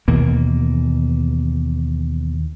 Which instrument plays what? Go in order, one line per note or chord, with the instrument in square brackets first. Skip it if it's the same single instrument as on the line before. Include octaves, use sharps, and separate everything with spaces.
[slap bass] D#2 B2 E3 A#3